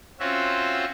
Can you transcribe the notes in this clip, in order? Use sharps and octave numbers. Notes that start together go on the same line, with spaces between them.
C4 C#4 F4 F#4 E5